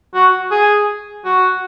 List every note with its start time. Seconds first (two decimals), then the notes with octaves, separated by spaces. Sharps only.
0.15 F#4
0.51 G#4
1.25 F#4